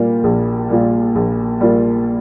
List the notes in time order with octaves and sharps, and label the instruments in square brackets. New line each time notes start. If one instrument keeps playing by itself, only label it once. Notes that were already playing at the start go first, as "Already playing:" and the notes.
Already playing: [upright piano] A#2 G3 A#3 F4
A#1
A#2 G3 A#3 F4
A#1
A#2 G3 A#3 F4